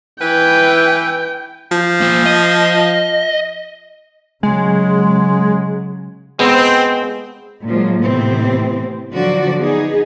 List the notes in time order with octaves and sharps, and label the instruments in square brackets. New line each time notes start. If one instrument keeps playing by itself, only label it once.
[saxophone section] E3 B4 [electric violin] G5
[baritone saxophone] F3
[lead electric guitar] A#3 C5
D#5
[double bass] C#3 F#3 [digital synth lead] G#3
[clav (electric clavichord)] G#3 B3 [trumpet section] C4
[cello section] A#2 F3 F#3 G#3
A2 C3 E3 B3 C4
D3 F3 F#3 F#4 D5
B3 D#4 G#4